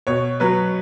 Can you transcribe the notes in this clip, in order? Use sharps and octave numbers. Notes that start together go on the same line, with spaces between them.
B2 C#5
F#3 B4